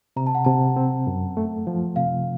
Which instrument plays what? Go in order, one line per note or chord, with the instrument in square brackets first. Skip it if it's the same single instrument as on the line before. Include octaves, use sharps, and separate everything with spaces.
[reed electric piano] C3 [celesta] A#5
[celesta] A5
F#5
[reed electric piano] C3 [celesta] A5
[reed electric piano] C4
F#2
A3
F3
[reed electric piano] C3 [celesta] F5